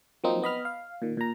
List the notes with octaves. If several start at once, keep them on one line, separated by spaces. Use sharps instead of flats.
F3 F#3 A#3 C4 D#4
B3 D#5 B5 F6
F5
A#2 D#3
A#2 A#5